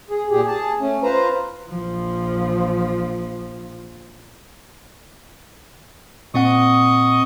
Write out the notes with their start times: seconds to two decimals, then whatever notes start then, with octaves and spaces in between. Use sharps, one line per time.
0.10 G#4
0.31 A#2 G4 G#4
0.47 G#4 A5
0.80 A3 C#4
1.03 F4 B4 C5 A#5
1.69 A#1 F3
6.34 A#2 C4 D#5 F#5 C#6 D#6